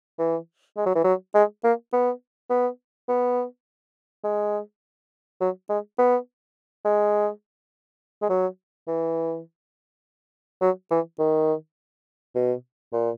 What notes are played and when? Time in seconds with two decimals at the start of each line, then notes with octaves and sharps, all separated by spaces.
0.19 E3
0.77 G#3
0.86 F#3
0.95 E3
1.04 F#3
1.34 G#3
1.64 A#3
1.93 B3
2.50 B3
3.09 B3
4.24 G#3
5.41 F#3
5.69 G#3
5.99 B3
6.85 G#3
8.22 G#3
8.29 F#3
8.87 E3
10.62 F#3
10.91 E3
11.19 D#3
12.35 B2
12.93 A#2